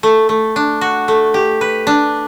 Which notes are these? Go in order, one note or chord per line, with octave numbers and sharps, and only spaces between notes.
A3
A3
D4
F#4
A3
G4
B4
D4